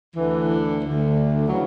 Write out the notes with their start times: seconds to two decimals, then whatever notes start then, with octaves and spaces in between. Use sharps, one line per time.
0.14 D2 D3 E3
0.82 D2 D3
1.48 C#3 E3 F#3